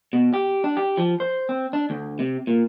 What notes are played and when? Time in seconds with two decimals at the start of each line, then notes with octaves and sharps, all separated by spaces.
0.13 B2
0.34 G4
0.64 D4
0.77 G4
0.97 F3
1.20 C5
1.49 C4
1.73 D4
1.90 D2
2.19 C3
2.47 A#2